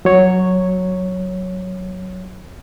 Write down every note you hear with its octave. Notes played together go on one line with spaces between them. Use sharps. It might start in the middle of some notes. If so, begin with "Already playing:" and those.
F#3 C#5